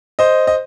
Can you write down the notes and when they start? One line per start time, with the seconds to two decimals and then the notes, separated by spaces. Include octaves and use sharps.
0.19 C5 D#5
0.47 D#5